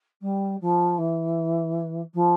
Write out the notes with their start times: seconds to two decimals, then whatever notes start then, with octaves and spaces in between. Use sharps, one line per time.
0.21 G3
0.60 F3
0.98 E3
2.14 F3